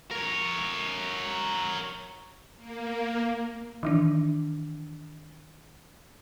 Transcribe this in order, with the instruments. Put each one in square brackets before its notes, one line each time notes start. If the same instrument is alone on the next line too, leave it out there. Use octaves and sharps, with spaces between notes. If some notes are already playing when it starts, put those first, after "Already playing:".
[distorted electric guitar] A#4 C#5
[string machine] A#3
[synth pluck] D#3 E3 D4